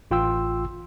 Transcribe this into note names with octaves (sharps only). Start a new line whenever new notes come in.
A1 F4 G5 C6 E6